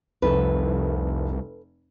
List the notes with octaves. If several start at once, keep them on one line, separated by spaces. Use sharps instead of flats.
F1 C2 A4 B4